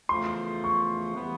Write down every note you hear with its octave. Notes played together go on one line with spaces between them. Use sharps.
E2 C#3 F3 A3 C6
C#6
E3 G3 B3